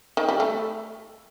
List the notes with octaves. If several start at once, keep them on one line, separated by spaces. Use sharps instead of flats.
D#3
G3
A3